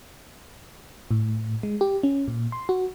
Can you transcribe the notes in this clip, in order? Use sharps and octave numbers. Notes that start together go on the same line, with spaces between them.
A2
G#3
G4
C#4
A#2
C6
F#4